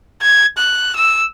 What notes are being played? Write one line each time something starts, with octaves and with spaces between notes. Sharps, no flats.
G#6
F#6
E6